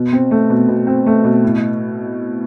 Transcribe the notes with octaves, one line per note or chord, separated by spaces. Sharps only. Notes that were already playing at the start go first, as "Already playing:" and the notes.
Already playing: B2
C4
A3
B2
B2
C4
A3
B2
A2